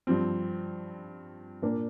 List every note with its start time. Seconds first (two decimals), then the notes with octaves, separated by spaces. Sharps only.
0.07 G2 F3 C4
1.62 A#2 A#3 D4